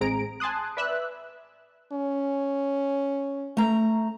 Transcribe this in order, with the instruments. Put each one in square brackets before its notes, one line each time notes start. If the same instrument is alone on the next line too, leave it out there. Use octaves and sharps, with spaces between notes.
[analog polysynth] A1 G#3 C4 G#4 A#5 D7
G#5 A5 C6 D#6 F#6
B4 D5 E5 E6 F#6
[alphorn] C#4
[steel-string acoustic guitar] A3 A#5